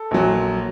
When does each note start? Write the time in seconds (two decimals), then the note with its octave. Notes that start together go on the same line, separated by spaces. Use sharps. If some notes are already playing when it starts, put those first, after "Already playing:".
Already playing: A4
0.11 A#1 A#2 F#3